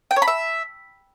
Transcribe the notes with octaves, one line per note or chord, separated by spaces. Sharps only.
G5
C#5
B5
E5